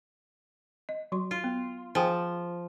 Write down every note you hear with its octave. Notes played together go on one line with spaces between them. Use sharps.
D#5
F#3 F#4 C6
F4
B3
F3 G#4 G5 G#5